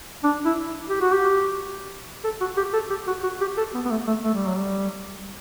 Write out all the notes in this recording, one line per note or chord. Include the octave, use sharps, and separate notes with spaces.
D4
E4
G4
F#4
G4
A4
F#4
G4
A4
G4
F#4
F#4
G4
A4
B3
B3
A3
A3
A3
G3
F#3
G3